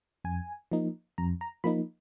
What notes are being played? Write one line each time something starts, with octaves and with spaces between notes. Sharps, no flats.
F2 G#5
F3 A#3 D#4
F2 A#5
A#5
F3 A#3 D#4 B5